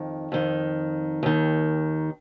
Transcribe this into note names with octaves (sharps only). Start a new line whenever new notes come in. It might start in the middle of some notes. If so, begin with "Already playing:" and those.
Already playing: F2 D#3
F2 D#3
D#2 D#3